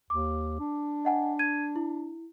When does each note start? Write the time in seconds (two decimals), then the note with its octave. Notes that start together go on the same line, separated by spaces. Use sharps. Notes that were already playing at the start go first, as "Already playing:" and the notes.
0.10 D#2 D6
0.60 D4
1.05 D#5 F#5 G#5
1.39 G#6 D#7
1.76 E4